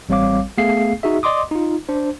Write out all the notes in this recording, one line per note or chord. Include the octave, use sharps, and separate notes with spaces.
A1 G3 C4 C#5 F5 D6
A3 B3 G#4 F5 C7
D#4 F#4 G#4 E5
D5 D#5 C6 D6 D#6
D#4 F4
D4 C5